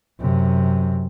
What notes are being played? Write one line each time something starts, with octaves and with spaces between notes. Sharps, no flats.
F#2 C3